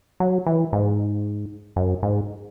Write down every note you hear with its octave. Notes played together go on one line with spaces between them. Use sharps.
F#3
E3
G#2
F#2
G#2